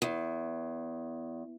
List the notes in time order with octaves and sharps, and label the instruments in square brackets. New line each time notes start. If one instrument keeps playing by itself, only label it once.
[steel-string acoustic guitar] E2